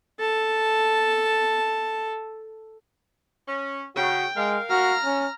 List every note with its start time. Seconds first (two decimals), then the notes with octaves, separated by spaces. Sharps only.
0.19 A4 A5
3.48 C#4
3.96 C#3 F#4 G5
4.36 G#3 A#4 F5
4.70 F#4 A#5 F6
5.04 C#4